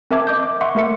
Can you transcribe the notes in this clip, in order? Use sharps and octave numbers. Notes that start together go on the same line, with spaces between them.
C4 A#4 E5 A5 D6 G#6
D#5 D6 G6
D6
E5 F#5 C6 C#6
A3 A#3 A#4 E5 C#7